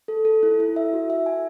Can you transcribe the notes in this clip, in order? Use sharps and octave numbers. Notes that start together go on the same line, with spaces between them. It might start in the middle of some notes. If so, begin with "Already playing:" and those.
A4
A4
E4
E4
E5
F#4
E5
G#5